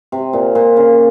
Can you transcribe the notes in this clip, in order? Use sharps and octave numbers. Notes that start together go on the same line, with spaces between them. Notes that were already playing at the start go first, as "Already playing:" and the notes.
C3
A#2
A#2
C#3